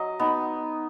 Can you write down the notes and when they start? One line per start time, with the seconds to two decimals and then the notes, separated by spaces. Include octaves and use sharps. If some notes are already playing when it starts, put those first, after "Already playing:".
Already playing: F#3 D#5
0.20 B3 D#4